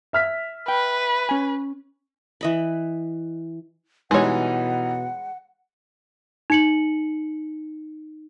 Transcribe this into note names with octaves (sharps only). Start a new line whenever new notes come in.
E5 F6 B6
B4 G5
C#4 G#5
E3 D#5 B5
B2 E3 G3 G#3 D#4 C#5 F#5
D#4 C#7 F#7